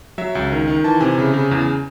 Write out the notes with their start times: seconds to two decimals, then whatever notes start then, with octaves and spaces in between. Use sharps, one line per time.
0.18 F#3 E5
0.35 C#2
0.52 D#3
0.68 D#3
0.84 E3 A5
1.00 C3 G#5
1.18 C#3
1.34 C#3
1.51 E2